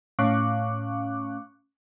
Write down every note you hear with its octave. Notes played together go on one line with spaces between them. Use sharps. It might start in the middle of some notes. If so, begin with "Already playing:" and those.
A2 C#4 F5 C#6 D6 F#6